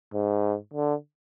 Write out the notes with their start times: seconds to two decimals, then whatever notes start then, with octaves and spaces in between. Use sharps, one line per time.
0.14 G#2
0.74 D3